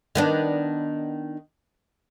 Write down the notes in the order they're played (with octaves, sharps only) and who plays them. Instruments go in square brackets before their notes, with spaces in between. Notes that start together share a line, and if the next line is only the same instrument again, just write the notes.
[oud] D#3 B3 D4